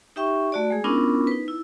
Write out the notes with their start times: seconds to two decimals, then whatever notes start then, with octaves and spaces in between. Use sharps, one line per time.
0.16 D#4 G4 E5 G5 C#6
0.52 A3 F#4 D5
0.71 G#3 G#4
0.84 B3 C#4 D4 E4 F4 A#4
1.27 D#4 B4
1.48 E4